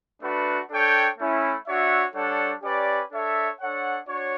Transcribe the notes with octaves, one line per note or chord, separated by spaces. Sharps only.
A3 D4 F#4 B4
D4 A4 C#5 G5
A3 C#4 E4
D4 F#4 C#5 E5
G3 D4 A4 C#5 F#5
C#4 G4 B4 D5
D4 A4 C#5 E5
D4 A4 C#5 F#5
D4 F#4 C#5